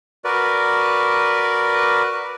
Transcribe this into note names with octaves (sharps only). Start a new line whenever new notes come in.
F#4 A#4 B4 D5